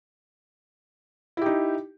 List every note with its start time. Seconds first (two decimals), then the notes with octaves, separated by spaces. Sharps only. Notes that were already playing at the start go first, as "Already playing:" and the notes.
1.37 E4
1.42 G4
1.46 D#4